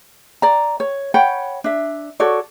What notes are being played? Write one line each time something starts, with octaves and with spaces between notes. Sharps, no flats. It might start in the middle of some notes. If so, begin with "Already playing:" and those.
D5 A#5
C#5
C#5 F#5 G5 B5
D4 E5
F#4 A4 C#5 D5